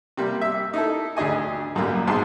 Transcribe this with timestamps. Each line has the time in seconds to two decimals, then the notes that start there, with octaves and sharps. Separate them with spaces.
0.17 C3 G3 A#3
0.41 E5 E6
0.74 D#4 E4 A4
1.17 D2 D4 G#4 D#5 G#5
1.75 B1 F#2 A#2 G3 A#3
2.07 A#1 G#2 B2 A5 C6